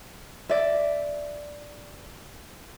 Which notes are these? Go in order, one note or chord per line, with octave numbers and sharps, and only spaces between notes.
D5 E5